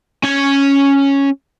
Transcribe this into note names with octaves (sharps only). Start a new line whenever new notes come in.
C#4 G#5